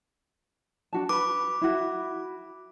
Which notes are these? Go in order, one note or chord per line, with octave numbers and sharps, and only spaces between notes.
D4 F#4 A5
B4 B5 D6
E4 F#4